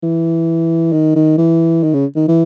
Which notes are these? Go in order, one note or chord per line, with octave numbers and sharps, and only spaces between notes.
E3
D#3
D#3
E3
D#3
C#3
D#3
E3